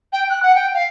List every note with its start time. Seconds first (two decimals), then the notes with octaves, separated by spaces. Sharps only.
0.13 G5
0.30 F#6
0.43 F#5
0.55 G5
0.75 F5